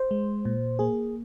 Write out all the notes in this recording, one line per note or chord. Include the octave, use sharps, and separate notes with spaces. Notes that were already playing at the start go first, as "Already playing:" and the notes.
Already playing: C5
G#3
A#2
A#3 G#4